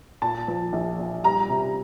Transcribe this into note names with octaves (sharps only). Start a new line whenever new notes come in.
A#2 A5
F3
A#1
A#2
G3 A#5
C3